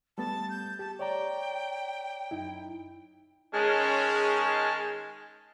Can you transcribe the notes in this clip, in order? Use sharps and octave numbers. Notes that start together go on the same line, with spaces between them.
G3 A3 B3 A5
G6
G4 A5
C#5 D5 G5 A#5
F#2 D#4 E4
D#3 G#3 C#4 G#5 A5 F6